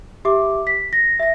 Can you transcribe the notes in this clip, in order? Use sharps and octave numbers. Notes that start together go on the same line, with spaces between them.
G4 E5 D6
B6
A#6
E5 A#6